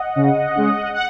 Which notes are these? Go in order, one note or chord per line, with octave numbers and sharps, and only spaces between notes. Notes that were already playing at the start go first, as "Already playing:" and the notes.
Already playing: D#5 F#5
C#3
G#3 C#4
F#5